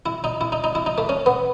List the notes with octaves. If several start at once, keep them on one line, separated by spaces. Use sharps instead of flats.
E4
D#4
E4
D#4
D#4
E4
D#4
A3
C#4
B3